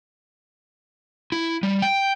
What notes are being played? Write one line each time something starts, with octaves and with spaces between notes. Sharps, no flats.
E4
G3
G5